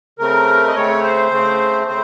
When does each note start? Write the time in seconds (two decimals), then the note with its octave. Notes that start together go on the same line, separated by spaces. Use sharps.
0.19 C#3 A3 C4 A#4
0.68 D#5
0.75 C#3 A3 C4 C#5
1.03 C5
1.32 C#3 A3 C4
1.87 C#3 A3 C4 C5